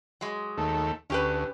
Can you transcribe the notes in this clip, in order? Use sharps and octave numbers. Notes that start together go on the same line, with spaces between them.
F#3 G#3
D#2 A3
D2 C#4 G4 B4